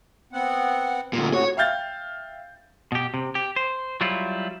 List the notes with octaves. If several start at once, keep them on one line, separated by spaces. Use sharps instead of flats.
B3 C4 F#5
D2 A#2
A2 C#3 F#4 C#5
E5 F5 G5 F6 G6 A6
B2 G4
C3
G4
C5
F#3 G3 E4 F4